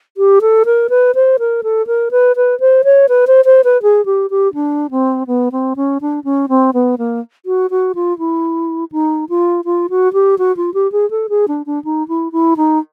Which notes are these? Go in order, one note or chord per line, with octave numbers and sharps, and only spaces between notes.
G4
A4
A#4
B4
C5
A#4
A4
A#4
B4
B4
C5
C#5
B4
C5
C5
B4
G#4
G4
G4
D4
C4
B3
C4
C#4
D4
C#4
C4
B3
A#3
F#4
F#4
F4
E4
D#4
F4
F4
F#4
G4
F#4
F4
G4
G#4
A4
G#4
D4
D4
D#4
E4
E4
D#4